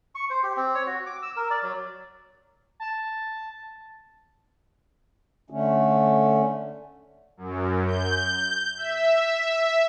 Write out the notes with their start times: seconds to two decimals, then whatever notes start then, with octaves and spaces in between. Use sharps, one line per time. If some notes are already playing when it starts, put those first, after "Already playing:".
0.15 C#6
0.30 C5
0.43 G4
0.57 C4
0.75 C#5
0.87 F#4
1.06 D6
1.22 E6
1.36 A#4
1.50 D5
1.63 F#3
2.80 A5
5.50 D3 A3 C#4
7.37 F#2
7.87 G6
8.77 E5